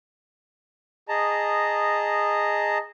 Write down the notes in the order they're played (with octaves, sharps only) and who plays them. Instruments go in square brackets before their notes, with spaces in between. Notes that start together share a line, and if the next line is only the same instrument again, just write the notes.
[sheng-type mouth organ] G#4 D#5 A5 A#5